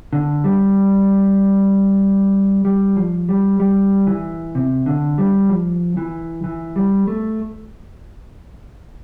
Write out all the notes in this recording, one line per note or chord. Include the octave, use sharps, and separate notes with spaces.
D3
G3
G3
F3
G3
G3
E3
C3
D3
G3
F3
E3
E3
G3
A3